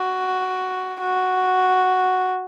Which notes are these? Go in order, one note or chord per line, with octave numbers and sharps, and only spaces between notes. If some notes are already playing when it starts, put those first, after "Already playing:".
Already playing: F#4
F#4